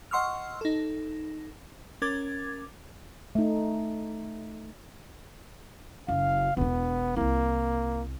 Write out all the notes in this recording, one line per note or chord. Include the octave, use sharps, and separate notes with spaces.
D#5 F#5 C6 C#6 E6 F6
D#4 A4
C#4 A#4 D6 G#6 A6
A3 D#4
F#1 F5
E1 B3 D4
C2 A#3 E4